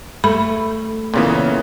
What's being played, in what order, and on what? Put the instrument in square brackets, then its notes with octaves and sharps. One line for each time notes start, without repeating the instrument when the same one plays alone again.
[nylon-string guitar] A3 [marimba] B5
[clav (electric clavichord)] A#2 C#3 [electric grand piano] E3 B3 F4